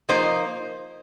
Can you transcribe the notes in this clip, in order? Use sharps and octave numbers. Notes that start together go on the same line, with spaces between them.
F3 A#3 D#4 C5